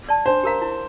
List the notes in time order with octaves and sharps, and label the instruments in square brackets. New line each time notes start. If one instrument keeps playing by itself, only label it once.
[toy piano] D5 A5
[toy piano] D4 [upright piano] C5
[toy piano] G4 A#4 F5 A#5
E4